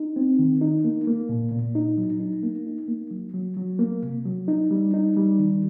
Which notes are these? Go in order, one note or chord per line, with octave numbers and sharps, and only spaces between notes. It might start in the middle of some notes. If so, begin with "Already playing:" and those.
Already playing: D#4
C4
D#3
D#4
A#3
A#3
A#2
A#2
D#4
F#3
D#4
A#3
D#4
A#3
F#3
F#3
F#3
A#3
C3
F#3
D#4
G3
D#4
G3
D#3